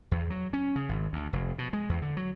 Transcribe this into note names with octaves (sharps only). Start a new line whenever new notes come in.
E2
F#3
C#4
C#3
G#1
D2
F1
B2
G#3
E2
D3
F#3